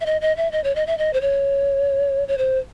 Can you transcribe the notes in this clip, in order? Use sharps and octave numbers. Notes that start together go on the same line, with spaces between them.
E5
D#5
D#5
E5
D#5
C#5
D#5
E5
D#5
C5
C#5
C#5
C5